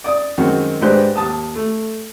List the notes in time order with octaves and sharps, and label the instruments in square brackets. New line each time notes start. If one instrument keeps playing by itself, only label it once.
[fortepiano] D5 D#6
F#2 D#3 G#3 C4 F#4
G#2 D4 G4 B4 C5 F#6
D#2 A5 D#6
A3